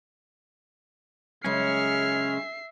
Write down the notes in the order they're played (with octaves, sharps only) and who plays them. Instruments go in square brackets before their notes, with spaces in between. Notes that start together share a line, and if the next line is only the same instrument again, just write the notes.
[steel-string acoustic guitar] F#2 C#3 G#3 [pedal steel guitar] C#4 [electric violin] E5 C7 [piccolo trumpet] F6